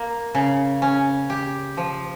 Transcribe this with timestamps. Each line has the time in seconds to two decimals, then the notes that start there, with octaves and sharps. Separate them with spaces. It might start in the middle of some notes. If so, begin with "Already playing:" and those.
Already playing: A#3
0.35 C#3
0.82 C#4
1.30 G4
1.77 F3